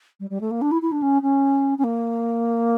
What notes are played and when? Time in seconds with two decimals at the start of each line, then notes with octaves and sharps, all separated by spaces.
0.20 G3
0.30 G3
0.41 A3
0.51 A#3
0.62 D4
0.71 E4
0.82 E4
0.92 D4
1.02 C#4
1.22 C#4
1.78 C#4
1.84 A#3